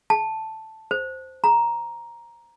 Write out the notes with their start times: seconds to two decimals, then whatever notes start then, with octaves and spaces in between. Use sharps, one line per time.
0.10 A5
0.91 C5
1.44 A#5